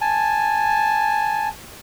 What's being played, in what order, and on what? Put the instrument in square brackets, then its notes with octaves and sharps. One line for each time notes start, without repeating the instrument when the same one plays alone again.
[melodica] G#5 A5